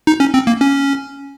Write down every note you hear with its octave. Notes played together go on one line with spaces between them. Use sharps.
D#4
C#4
C4
A#3
C#4